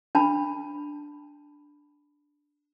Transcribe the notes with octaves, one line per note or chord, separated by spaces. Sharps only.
D4 A5 B5